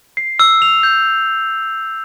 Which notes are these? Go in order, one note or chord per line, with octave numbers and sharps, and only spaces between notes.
C7
E6
F7
G6